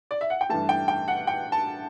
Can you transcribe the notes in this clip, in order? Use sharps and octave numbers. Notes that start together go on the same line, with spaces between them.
D5
E5
F#5
G5
G2 E3 A3 A5
G5
G5
F#5
G5
A5